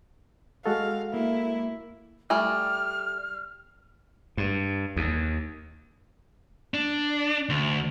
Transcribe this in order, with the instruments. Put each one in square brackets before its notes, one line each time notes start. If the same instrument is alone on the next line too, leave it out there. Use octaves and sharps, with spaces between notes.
[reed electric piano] G#3 F#4 A4 [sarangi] F5
[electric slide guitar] A#3 [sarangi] E4
[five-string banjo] G3 A3 G#5 [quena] F6
[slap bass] G2
D#2
[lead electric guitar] D4
D2